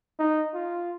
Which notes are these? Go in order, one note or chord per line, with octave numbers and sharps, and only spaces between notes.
D#4
F4